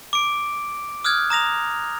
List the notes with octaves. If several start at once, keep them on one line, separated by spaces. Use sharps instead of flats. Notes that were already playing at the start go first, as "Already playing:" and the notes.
D6 D7
D#6 F6 F#6 G#6
A#5 D#6 A#6 F7